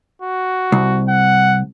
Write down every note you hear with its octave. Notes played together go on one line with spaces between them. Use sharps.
F#4
C2
F#5